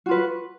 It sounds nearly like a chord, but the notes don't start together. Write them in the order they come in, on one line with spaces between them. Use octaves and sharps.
F#4 F4 B4